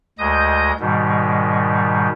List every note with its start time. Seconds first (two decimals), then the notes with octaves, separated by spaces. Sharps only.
0.19 D2 G#3 D#5 D#6 G6
0.80 G#2 B2 D#3 G3